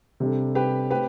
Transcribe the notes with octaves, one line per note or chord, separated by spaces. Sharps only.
C3 G3 D4 A4
G4 B4
A3 C4 G4 B4